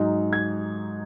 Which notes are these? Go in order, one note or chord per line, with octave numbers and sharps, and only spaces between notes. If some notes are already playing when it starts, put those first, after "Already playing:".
Already playing: G#2 F#3 D#4
G#6